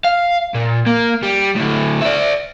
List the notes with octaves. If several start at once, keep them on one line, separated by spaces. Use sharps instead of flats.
F5
A#2
A#3
G3
A2 D3
D5 E5